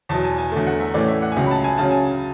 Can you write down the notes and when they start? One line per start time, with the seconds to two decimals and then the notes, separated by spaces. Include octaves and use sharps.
0.09 E2 B2 F#3 A5
0.24 G#5
0.38 G#5
0.52 E2 D3 F#3 A3
0.67 F#5
0.80 E5
0.94 A2 E3 A3 C#4 D5
1.08 E5
1.22 F#5
1.32 G#5
1.36 C#2 C#3 F#3 F#5
1.46 B5
1.51 A5
1.64 G#5
1.78 C#3 F#3 C#4 A5
1.91 G#5